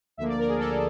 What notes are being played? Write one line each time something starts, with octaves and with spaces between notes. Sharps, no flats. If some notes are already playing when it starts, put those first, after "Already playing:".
D2 D3 F3 A#3 E5
D5
A#4
G#4
A4
A#4